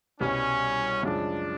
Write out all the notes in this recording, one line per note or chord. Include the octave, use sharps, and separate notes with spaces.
C2 B2 G3 C#4
F#2 C#3 F3 G#3 D4